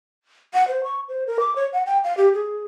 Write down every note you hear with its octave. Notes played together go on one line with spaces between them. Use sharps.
F#5
C5
C#6
C5
A#4
D6
C#5
F#5
G5
F5
G4
G#4